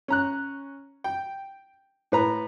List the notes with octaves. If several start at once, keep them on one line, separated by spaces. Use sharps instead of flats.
C#4 A#5 F#6
G5
A2 B4 A#5